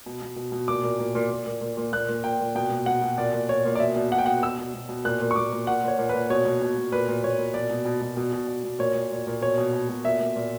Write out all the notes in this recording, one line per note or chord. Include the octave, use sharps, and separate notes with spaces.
B2
B2
B2
B2
A#2 D6
A#2
A#2
A#2
A#2
A#2
A#2
A#2
A#2 F#6
A#2
A#2 G5
A#2
B2 G5
B2
B2 F#5
B2
A#2 D5
A#2
A#2 C#5
A#2
D5
B2 E5
B2
B2 F#5
G5
B2 F#5
B2 E6
B2
B2
B2
A#2 F#6
A#2
C#6
A#2 D6
A#2
A#2 F#5
A#2 C#5
A#2
A#2 B4
B2 C#5
B2
B2
B2
A#2 B4
A#2
A#2 C#5
A#2
B2 D5
B2
B2
B2
B2
B2
B2
B2
A#2 C#5
A#2
A#2
A#2
B2 C#5
B2
B2
B2
A#2 E5
A#2
A#2